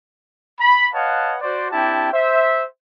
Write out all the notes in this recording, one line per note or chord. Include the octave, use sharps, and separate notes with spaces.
B5
B4 C#5 D#5 F5 F#5 A5
F#4 C5 D5
C4 D4 E4 G4 G5 A5
C5 E5